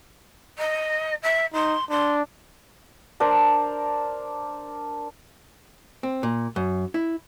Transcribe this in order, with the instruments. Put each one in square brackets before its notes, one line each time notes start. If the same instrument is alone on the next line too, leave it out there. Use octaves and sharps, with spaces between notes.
[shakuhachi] D#5
E5
[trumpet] D#4 [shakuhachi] C6
[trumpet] D4 [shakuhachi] C6
[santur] D4 A#4 C5
[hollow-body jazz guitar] C4
A#2
F#2
E4